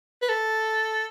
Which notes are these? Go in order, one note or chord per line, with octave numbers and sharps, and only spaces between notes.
B4
A4